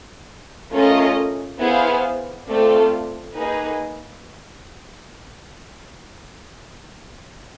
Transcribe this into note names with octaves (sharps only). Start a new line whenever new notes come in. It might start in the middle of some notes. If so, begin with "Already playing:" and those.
A3 C#4 F4 A#4 D#5
B3 E4 G#4 C5 F5
A3 C4 F4 A4 D5
A#3 D#4 G#4 B4